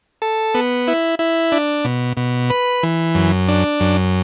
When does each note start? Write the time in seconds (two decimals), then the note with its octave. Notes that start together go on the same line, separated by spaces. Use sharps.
0.22 A4
0.54 B3
0.88 E4
1.19 E4
1.52 D4
1.85 B2
2.17 B2
2.50 B4
2.83 E3
3.15 F#2
3.48 D4
3.80 F#2